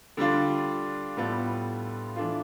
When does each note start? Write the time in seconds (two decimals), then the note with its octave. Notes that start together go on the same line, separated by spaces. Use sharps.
0.17 D3 G3 D4 F4
1.17 A2 G3 B3 F4 A4
2.16 E3 A3 D4 F4